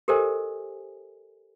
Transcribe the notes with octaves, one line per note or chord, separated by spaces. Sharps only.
G4 A4 A#4 C5 D#5 G#5